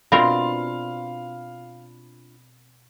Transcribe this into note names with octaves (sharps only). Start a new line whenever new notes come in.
B2 C4 D4 F4 A#4 F5 B5